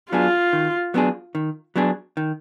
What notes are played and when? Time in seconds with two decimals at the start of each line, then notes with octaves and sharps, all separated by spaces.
0.12 F#3 B3 D4 F4 G#4
0.53 D#3
0.94 F#3 B3 D4 G#4
1.35 D#3
1.76 F#3 B3 D4 G#4
2.17 D#3